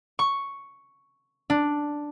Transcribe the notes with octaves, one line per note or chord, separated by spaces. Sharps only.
C#6
D4